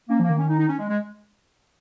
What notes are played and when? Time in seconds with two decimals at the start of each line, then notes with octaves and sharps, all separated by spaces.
0.09 A#3 C#4
0.19 F3
0.23 A#3
0.29 D#3
0.39 C#4
0.49 D#4
0.59 D#4
0.68 C#4
0.79 G#3
0.89 G#3